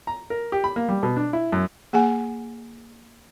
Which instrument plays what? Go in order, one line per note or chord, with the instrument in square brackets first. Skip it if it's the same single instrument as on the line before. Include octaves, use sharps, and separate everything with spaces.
[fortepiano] A#5
A#4
G4
B5
A#3
G3
B2
D4
E4
F#2
[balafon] A#3 G#4 F#5 G#5